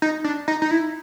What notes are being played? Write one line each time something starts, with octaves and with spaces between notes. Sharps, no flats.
D#4
D4
D#4
D#4
E4